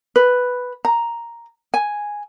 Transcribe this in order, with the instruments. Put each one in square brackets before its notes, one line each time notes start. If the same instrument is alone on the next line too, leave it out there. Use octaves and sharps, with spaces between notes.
[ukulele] B4
A#5
G#5